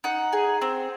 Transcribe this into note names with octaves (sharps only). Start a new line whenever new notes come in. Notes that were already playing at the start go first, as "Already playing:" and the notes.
D#4 F#5
G#4
C4